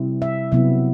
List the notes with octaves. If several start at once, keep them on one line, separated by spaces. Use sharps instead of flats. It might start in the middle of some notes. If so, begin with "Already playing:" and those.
Already playing: C3 G3 C4 E4
E5
C3 F#3 B3 E4 E5